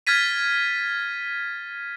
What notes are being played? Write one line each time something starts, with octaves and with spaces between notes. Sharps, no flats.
F6 G#6 A6 B6 D#7